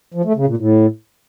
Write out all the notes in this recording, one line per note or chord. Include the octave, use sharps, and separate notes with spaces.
F3
A3
C#3
A#2
A2